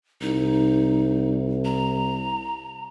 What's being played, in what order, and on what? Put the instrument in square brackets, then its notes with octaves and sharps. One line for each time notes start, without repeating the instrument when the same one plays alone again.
[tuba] C2 [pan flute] D#4
[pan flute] A#5